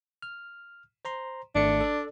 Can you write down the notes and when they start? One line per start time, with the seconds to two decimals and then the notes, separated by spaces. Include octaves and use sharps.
0.22 F6
1.05 C5 A#5 C6
1.55 G#1 A3 D4 C#7
1.81 A4 D5